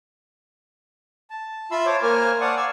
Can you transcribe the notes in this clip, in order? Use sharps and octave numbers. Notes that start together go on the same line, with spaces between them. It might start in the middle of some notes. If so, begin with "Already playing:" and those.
A5
F4 E5 B5 C6 E6
C5 C#5 A5 D6
A#3 A#4 C5 G#5 F6
D5 F5 F#5 A5 C#6 D#6
G#5 E6